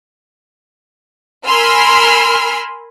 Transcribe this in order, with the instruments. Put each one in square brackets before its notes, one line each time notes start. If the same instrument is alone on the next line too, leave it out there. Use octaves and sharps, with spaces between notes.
[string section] A#4 G#5 B5 C6 E6 F6